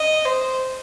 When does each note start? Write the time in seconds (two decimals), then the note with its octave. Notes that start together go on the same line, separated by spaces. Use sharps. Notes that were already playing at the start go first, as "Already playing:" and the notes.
Already playing: D#5
0.25 C5